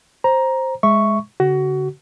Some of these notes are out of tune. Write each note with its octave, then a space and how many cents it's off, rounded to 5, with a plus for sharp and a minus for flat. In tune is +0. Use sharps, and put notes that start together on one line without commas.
C5 +10 A#5 +10
G#3 +0 E5 +0 C#6 +0
D3 -45 F#4 +20